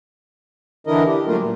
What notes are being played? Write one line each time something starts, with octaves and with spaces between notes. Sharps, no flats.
D3 E3 D4 E4 A#4 D#5
G4
F#3 G3 A3 A#3 F4 A#4
A#2